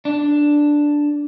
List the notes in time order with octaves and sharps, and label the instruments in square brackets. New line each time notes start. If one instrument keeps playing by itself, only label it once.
[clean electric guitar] D4